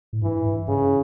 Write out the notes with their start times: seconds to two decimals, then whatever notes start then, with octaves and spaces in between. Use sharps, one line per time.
0.13 A2
0.22 G2 E3
0.45 G2
0.68 G2 C#3